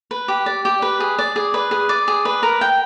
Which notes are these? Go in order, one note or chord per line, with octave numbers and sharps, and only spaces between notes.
B4
G4
D5
G4
B4
G#4
D5
G#4
B4
G#4
D5
G#4
B4
A#4
G5